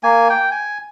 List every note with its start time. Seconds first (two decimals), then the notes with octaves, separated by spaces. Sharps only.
0.03 A#3 G#5
0.30 G5
0.51 G#5